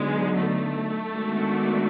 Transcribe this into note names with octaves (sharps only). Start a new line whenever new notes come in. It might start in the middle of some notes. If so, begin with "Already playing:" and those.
Already playing: D3 F#3 G#3 B3 D#4
A3
D#3 G#3 B3 D4 F#4